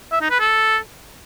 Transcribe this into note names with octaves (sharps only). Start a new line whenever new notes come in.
E5
D#4
B4
A4